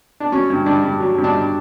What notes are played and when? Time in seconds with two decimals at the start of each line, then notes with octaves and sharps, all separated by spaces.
0.20 D4
0.32 F#3 C#4
0.50 G2
0.66 G2 D4
0.83 G2
1.00 F#3
1.18 G2
1.24 D4
1.34 G2